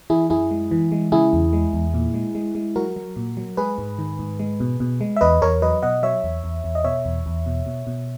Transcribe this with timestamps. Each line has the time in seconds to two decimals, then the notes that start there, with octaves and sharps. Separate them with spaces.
0.10 E3 E4 G#4
0.30 F#2 E4 G#4
0.51 G#3
0.71 E3
0.92 G#3
1.12 C#3 E4 G#4
1.33 E2
1.53 G#3
1.73 E2
1.94 A#2
2.14 G#3
2.35 G#3
2.55 G#3
2.76 F#3 F#4 A#4
2.96 F#3
3.16 A#2
3.37 F#3
3.57 G#3 G#4 B4
3.78 G#2
3.99 D#3
4.19 G#2
4.39 G#3
4.60 B2
4.80 B2
5.01 G#3
5.16 E5
5.21 E2 B4 D#5
5.42 E2 A#4 C#5
5.62 F#3 B4 D#5
5.82 B2 D#5 F#5
6.03 F#3 C#5 E5
6.23 E2
6.44 E2
6.64 E2
6.75 D#5
6.84 B2 C#5 E5
7.05 E2
7.26 E2
7.46 B2
7.66 B2
7.87 B2